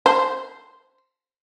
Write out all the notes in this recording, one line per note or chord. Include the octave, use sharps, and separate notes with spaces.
C5